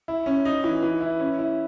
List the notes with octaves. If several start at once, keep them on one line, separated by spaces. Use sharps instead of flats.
E4
C#4
D#4
E3
E3
E4
C#4
E4